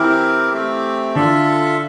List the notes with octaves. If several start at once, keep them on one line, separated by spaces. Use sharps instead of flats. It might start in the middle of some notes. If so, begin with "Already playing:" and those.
Already playing: E3 C4 E4 G4 A#4
A3 C4 G4
D3 D4 F4 A4 E5